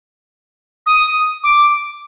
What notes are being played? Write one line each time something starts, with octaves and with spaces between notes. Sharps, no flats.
D#6
D6